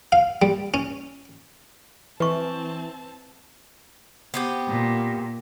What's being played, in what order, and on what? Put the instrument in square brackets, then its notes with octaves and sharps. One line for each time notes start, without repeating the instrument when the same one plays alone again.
[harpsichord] F5
G3
C#4
[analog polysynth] E3 [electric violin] C4 A5 [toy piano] B4 C#6
[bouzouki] B3 C4 G4
[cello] A#2